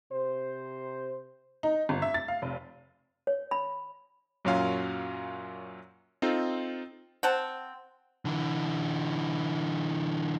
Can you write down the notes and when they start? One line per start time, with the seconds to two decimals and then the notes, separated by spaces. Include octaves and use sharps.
0.12 C3 C5
1.63 D#4
1.89 G1
2.02 E5
2.14 A6
2.28 F5
2.42 F1
3.27 C#5
3.51 B5
4.45 F#2 A#2 F#3 C#4 F4 F5
6.22 C4 D#4 F4 A4
7.23 C4 F#5 A5
8.25 D3 E3